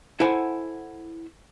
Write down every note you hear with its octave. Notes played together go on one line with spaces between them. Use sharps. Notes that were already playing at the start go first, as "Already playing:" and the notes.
E4 A4 C5 F#5 G#5